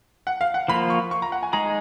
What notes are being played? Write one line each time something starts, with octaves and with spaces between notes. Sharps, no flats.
F#5
F5
F#5
F3 A#3 F4 B5
C#6
C#6
A#5
F#5
G#5
G#3 D#4 G#4 A#5